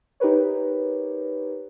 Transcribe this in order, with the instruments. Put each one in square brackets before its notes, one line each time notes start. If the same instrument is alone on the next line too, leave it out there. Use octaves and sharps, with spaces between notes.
[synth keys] D#4 G4 A#4 B4 C#5